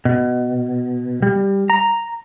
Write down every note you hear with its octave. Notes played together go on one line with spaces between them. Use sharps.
B2
G3
A#5